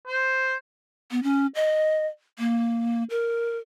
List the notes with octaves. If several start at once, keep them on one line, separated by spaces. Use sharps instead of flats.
C5
B3
C#4
D#5
A#3
A#4